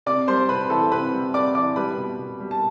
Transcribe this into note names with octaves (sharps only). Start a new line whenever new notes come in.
C3 D5 D6
G3 C5 C6
C3 B4 B5
E3 A4 A5
C3 B4 B5
G3
C3 D5 D6
E3 D5 D6
G3 B4 B5
B2
B2
G3
A5